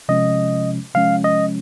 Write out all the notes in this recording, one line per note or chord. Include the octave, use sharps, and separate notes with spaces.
C3 F3 G#3 C#4 D#5
C3 F3 G#3 C#4 F5
D#5